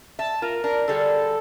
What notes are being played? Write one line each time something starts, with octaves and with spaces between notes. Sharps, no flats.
E5 A5
F4 A#4
D4 A#4
D3 G3 G#4 A4